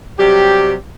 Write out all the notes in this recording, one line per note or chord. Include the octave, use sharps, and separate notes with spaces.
C3 F#3 G3 G4